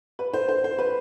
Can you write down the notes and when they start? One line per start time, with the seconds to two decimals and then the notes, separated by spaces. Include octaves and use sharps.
0.19 B4
0.34 C5
0.49 C5
0.64 C5
0.79 B4